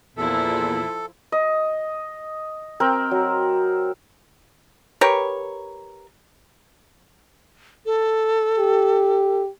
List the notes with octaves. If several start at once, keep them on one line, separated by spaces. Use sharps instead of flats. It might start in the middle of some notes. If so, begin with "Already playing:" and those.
E2 A#2 F3 E4 F4 A4
D#5
C4 A#4 G5
F#3
G4 A#4 B4 C#5
A4
G4